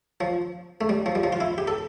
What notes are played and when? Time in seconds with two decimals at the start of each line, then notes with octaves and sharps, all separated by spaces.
0.21 F3
0.81 A3
0.89 G3
1.06 F3
1.15 G3
1.24 F3
1.33 F4
1.41 E4
1.58 G4
1.68 A4